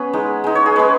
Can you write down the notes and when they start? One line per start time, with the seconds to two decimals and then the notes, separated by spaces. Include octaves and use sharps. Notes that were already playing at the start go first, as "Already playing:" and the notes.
Already playing: B3 C#4 G#4 B4
0.13 G#3 D#4
0.44 G#3 D#4
0.55 C#5
0.66 G#4
0.76 G#3 C#4 B4